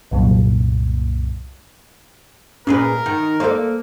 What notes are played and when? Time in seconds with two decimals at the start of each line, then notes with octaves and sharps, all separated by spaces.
0.11 C2 F#2 A#2
2.67 A#2 C#4 G#4 A#4 B4
3.06 D#3
3.40 A#3 A4 C5 D5